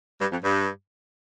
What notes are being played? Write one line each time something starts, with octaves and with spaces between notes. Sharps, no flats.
G2
F2
G2